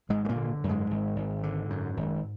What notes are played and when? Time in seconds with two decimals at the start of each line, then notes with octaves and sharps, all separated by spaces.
0.09 G#1 G#2 G#3
0.25 G#3
0.29 A#2 A#3
0.36 D3
0.64 F#2
0.69 G#2 G#3
0.90 G#1
1.16 G#1
1.43 D3
1.70 F#2
1.97 G#1